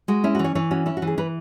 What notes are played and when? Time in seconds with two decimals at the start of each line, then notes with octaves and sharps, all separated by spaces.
0.08 G#3 F#4
0.24 C#4 E4
0.35 E3 F#4
0.44 C#5
0.55 E3 C#5
0.71 C#4 F#4
0.86 C#4 E4
0.97 F#4
1.02 E3
1.07 G#4
1.18 E3 B4